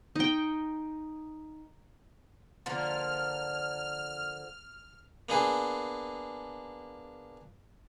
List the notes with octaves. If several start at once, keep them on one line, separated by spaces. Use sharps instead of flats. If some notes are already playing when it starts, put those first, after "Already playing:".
D#4 G5
D3 F3 A#3 F6
A#3 B3 D4 G#4